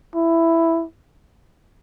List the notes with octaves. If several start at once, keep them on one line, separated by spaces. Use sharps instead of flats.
E4